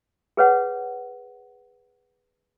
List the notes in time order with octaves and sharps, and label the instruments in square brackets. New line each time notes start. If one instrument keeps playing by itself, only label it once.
[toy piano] G#4 B4 C#5 F#5